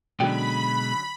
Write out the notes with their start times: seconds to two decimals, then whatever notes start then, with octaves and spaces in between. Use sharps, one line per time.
0.20 B2 D3 F#3 G#3 C#4 G5 B5